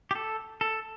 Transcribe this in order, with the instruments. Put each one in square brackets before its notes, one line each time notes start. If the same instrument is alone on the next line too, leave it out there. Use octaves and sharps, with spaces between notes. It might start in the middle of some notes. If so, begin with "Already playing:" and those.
[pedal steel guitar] G4
A4
A4